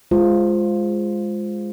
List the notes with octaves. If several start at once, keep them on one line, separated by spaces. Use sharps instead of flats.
G#3 F4 C5